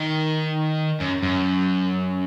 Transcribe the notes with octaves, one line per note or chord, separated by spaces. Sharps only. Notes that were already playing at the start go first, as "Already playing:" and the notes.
Already playing: D#3
F#2
F#2